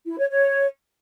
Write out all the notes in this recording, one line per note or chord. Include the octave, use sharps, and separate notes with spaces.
E4
C#5
C#5